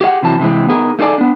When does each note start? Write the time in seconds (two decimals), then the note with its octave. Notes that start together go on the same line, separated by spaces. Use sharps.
0.01 G4 G#4 D#5 F#5
0.23 C3 E3 F#3 A5
0.40 C3 E3 G#3 C4
0.68 B3 D#4 G#4 A#4
0.99 A3 D#4 G#4 A4 D5 G#5
1.18 B3 D4